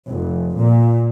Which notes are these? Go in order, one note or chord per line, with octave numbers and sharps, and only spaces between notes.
F1
A#2